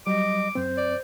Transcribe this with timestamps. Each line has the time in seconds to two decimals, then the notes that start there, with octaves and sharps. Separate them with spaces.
0.07 F#3 G3 D#5 D6
0.55 F#2 C4 C5
0.78 D5